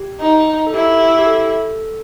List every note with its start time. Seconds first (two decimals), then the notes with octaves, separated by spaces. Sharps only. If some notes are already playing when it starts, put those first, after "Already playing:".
Already playing: G4
0.21 D#4
0.67 A4
0.74 E4 G4
1.01 G4
1.19 G4
1.27 A4